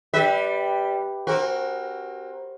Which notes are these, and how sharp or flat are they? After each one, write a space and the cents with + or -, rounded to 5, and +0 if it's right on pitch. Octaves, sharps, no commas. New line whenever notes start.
G3 +0 B4 +0 E5 -35
C4 +30 F#4 +0 A#4 +10